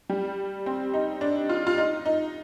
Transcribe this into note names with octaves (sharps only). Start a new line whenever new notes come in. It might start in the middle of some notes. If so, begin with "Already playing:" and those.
G3
C4
D#4
D4
F4
F4
D#4
D#4